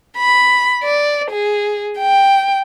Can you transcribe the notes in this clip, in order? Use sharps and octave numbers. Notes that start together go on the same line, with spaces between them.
B5
D5
G#4
G5